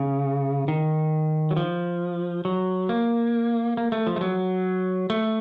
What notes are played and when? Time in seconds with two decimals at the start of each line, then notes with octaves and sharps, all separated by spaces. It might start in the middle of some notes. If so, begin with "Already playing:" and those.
Already playing: C#3
0.68 D#3
1.51 F#3
1.57 F3
2.45 F#3
2.89 A#3
3.77 A#3
3.92 A3
4.07 F3
4.16 A3
4.21 F#3
5.10 A3